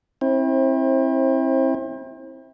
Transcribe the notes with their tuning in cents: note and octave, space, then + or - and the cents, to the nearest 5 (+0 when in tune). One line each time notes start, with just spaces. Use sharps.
C4 +25 E4 -20 C5 +35